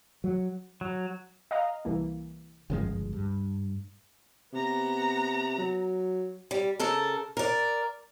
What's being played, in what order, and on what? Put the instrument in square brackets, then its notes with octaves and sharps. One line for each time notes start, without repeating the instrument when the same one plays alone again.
[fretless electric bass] F#3
[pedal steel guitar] F#3
[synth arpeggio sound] D#5 F5 A#5
C2 E3 A#3
[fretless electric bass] G1 F3 G#3 [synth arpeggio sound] C#2 F#2
[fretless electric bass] G2
[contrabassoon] C3 [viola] B3 A#5
[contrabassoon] F#3
[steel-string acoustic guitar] G3
C#3 A4 A#4
A#4 D5